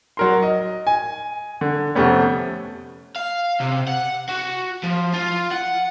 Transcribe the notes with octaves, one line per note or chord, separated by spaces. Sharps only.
F#3 A#4 C6
D#5
G#5
D3
F2 C3 A3 B3 C#4
F5
C3
F#5
F#4
F3
F4
F#5